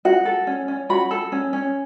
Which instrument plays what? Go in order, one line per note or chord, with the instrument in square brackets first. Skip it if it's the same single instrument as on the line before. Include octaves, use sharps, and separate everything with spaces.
[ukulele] F#4 F#5
A4
C#4
C#4
F#4 B5
A4
C#4
C#4